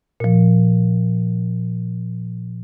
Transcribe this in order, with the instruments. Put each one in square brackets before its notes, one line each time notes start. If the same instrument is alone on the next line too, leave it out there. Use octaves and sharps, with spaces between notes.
[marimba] A#2 F3